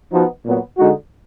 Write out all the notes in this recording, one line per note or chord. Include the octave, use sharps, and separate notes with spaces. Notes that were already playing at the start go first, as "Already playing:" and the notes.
F3 B3 D#4 F#4
A#2 F#3 B3
D3 G#3 D#4 F#4